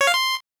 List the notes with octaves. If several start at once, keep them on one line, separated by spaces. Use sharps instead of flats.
C#5
F5
C6